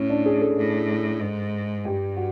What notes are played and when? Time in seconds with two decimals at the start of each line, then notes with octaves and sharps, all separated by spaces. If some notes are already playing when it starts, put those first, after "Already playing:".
Already playing: A2 C#4
0.10 D4
0.26 G#4
0.41 A4
0.57 A2
1.20 G#2
1.84 G2 G4
2.17 F#4